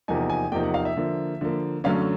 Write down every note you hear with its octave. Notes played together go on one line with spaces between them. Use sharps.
E2 C3 F3 A#3 D#4 G#5
G#5
E2 C3 F3 A#3 D#4 G5
F#5
F5
E5
D3 F3 A#3
D3 F3 A#3
F#2 D3 F#3 A3 C#4 F5